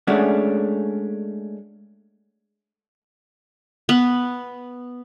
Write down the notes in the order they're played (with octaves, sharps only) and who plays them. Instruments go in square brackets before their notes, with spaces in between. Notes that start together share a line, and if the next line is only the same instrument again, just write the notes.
[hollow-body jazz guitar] G#3 A3 C#4 D4 F#4
[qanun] B3